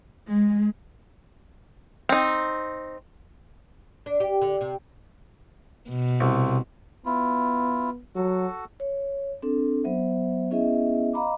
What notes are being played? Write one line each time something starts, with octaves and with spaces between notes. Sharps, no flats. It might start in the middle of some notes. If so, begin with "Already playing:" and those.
G#3
C4 D#4
D4
G4
D3
C3
B2
C2
B3 E4 F4
F#3 F#4 A4
C#5
C4 D4 A4
F#3 B3 C5 E5
B3 C#4 E4 G#4 D#5 E5
D#5 F5 A#5 B5 D6